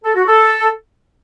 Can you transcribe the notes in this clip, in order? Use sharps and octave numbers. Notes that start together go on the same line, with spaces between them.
A4
F#4
A4